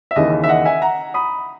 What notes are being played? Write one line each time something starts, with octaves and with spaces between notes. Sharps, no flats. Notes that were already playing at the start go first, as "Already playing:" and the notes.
E5
D#2 C#3 E3 D#5
E5
D#5 F#5
E5 G#5
F#5 A#5
B5 D#6